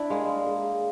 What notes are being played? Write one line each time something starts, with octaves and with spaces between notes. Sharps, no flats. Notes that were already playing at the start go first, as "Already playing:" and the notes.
Already playing: D4 E4
G#3 A#3 F5
F5
G#4
F5